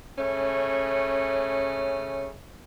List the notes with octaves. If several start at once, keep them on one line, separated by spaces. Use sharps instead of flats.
C#3 A3 C#4